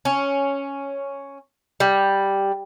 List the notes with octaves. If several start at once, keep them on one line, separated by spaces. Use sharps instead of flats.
C#4
G3